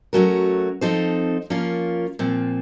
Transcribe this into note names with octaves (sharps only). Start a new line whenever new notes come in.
F#3 A3 C#4 F#4 A#4
F3 C4 D#4 A4 C5
F3 A#3 C#4 F4 A#4
A#2 F3 C4